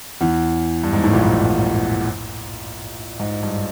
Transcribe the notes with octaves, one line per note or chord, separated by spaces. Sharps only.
E2 E3
G2
G#2
A2
A#1 A#2
G#2
G2